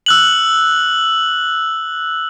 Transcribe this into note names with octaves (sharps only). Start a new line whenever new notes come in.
E6 F#6 F#7